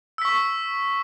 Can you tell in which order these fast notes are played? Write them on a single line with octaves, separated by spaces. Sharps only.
E6 B6 C#6